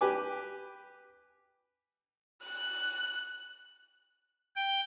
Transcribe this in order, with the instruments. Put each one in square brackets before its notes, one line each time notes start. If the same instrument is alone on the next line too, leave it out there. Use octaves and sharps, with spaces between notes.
[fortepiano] G4 B4 G#5 D6
[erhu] F#6
[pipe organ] G5